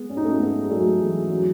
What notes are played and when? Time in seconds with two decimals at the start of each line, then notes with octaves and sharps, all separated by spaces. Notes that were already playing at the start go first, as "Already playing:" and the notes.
Already playing: G#3 B3
0.10 C#4
0.17 D#4
0.25 A3 C#4
0.40 G#3 B3
0.64 G#3
0.70 F#3 A3
1.00 E3 G#3
1.31 F#3